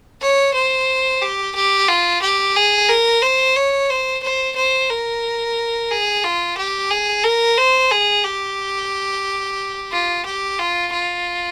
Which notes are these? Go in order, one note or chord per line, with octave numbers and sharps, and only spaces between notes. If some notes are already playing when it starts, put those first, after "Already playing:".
C#5
C5
G4
G4
F4
G4
G#4
A#4
C5
C#5
C5
C5
C5
A#4
G#4
F4
G4
G#4
A#4
C5
G#4
G4
F4
G4
F4
F4